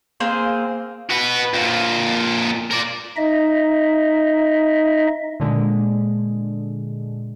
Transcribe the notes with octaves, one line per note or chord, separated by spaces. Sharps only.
A#3 C4 G#4 C5
F#4 B4
F2 A#2
A#4 D5
D#4 D#5 E5
A#2 D3 G#3